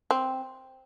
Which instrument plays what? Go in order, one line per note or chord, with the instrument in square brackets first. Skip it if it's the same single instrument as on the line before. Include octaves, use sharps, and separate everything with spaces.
[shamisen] C4